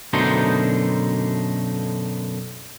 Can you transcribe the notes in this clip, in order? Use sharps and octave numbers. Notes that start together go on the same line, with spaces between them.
F#2 B2 D3 A3 D#4 C5